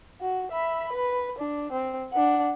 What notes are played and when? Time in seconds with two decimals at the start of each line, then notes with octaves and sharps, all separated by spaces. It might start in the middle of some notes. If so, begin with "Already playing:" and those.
0.21 F#4
0.52 E5 B5
0.92 B4
1.38 D4
1.72 C4
2.13 D4 F#5